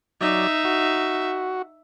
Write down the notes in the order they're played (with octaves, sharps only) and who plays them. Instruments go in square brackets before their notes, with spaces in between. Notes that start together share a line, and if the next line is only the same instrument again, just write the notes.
[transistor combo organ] F#3 D5 [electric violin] D#4 E5
[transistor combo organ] F#4